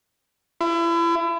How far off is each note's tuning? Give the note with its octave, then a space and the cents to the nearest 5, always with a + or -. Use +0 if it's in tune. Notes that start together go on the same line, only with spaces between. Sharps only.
E4 +35